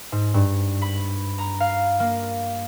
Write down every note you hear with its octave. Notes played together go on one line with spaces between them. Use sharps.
G#2
G2
B5
A#5
F5
A#3